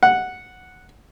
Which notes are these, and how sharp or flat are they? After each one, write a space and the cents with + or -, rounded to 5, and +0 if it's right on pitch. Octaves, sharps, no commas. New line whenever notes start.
F#5 -5